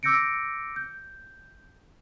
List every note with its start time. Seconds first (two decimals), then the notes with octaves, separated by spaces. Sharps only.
0.03 D6 E6 G6 A#6 C#7 D7
0.76 G6